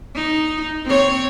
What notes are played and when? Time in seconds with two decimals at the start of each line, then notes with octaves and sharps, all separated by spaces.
0.16 D#4
0.85 C4 C#5